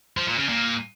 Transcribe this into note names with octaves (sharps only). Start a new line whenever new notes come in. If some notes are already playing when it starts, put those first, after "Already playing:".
F3
A#2
C#3
A#2